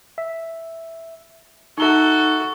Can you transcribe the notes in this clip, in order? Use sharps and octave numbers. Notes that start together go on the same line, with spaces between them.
E5
D#4 F#4 A4 E5 A#5 C#6 G7